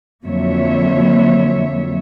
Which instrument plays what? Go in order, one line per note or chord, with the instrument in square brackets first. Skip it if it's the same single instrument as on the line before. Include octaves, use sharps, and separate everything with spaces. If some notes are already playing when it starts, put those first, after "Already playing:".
[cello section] F2 D3 F#3 A#3 C#5 E5